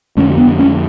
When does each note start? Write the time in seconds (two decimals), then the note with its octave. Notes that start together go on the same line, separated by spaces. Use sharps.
0.17 F2 D3 A3 C#4
0.38 B3 D4
0.59 A3 C#4